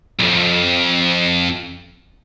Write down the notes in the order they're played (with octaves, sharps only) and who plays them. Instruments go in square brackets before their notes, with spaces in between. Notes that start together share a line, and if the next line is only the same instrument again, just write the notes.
[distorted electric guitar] B1 F2